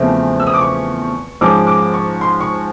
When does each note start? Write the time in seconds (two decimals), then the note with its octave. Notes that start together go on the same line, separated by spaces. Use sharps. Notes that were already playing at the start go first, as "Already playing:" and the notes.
Already playing: E2 C#3 F3 A3 C4
0.40 E6
0.47 D#6
0.54 D6
0.61 C#6
1.41 G#2 F3 G#3 C#4 D6
1.67 D6
1.94 C#6
2.21 C6
2.41 C#6